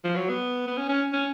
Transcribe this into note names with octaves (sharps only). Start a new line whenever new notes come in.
F3
F#3
B3
B3
C#4
C#4
C#4